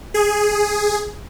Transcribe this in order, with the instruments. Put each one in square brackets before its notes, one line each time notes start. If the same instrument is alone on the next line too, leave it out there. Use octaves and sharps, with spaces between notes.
[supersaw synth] G#4